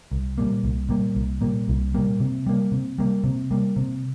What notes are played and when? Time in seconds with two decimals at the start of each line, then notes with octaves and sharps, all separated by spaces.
0.11 C2
0.38 A#2 G3 A#3
0.63 C2
0.89 A#2 G3 A#3
1.15 C2
1.41 A#2 G3 A#3
1.68 C2
1.94 A#2 G3 A#3
2.20 C3
2.46 G3 A#3
2.72 C3
2.98 G3 A#3
3.24 C3
3.51 G3 A#3
3.76 C3